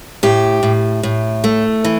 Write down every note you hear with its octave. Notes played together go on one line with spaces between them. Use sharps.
A2 G4
A2
A2
A3
E3